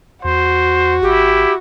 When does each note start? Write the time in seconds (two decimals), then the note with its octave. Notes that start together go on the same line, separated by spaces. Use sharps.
0.24 E2 F#4 C5
1.02 G#1 E4 G4